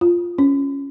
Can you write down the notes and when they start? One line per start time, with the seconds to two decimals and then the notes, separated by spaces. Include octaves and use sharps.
0.01 F4
0.38 C#4